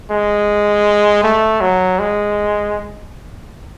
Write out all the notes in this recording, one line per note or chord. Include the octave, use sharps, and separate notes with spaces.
G#3
A3
F#3
G#3